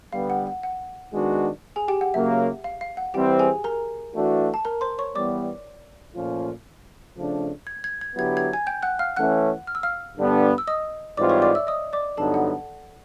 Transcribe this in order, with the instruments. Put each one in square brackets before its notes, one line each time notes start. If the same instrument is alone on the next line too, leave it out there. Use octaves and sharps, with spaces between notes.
[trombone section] D3 G3 B3 [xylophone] F5
[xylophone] F#5
F#5
F#5
[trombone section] D#3 G#3 B3 D4 F#4
[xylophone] G#4 G#5
G4 G5
F#5
[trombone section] C#3 F#3 A#3 [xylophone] E5
[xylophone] F5
F5
F#5
[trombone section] E3 G3 C4 [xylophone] G4 G5
[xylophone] G#4 G#5
A#4 A#5
[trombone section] E3 A3 D4 F#4
[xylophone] A5
A#4 A#5
C5 C6
C#5 C#6
[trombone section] E3 G3 B3 [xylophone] D5 D6
[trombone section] A#2 F3 A3 C#4 F4
C#3 F3 A3 D4
[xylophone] G#6
G#6
G#6
[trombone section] D3 F#3 B3 E4 G4 [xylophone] G#6
[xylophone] G#6
G#5 G#6
G5 G6
F#5 F#6
F5 F6
[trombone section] E3 A3 C#4 [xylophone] F#5 F#6
[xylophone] F6
E6
F5 F6
[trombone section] G2 D3 G3 B3 D4
[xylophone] E6
D#5 D#6
[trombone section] G#2 E3 G3 C4 F4 [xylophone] D5 D6
[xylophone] C#5 C#6
D5 D6
E5 E6
D#5 D#6
D5 D6
[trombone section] G2 D3 F#3 B3 D#4 [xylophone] A4 A5
[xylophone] F#5